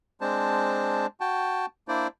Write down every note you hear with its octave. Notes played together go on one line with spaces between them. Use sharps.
G#3 C4 D4 C5 A5
F#4 G5 A5
A#3 D4 E4 C5 D5